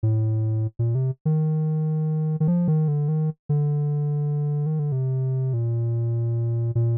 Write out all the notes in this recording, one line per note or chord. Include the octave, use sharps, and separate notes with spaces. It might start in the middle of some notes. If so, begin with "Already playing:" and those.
A2
A#2
C3
D#3
D#3
F3
D#3
D3
D#3
D3
D#3
D3
C3
A#2
A#2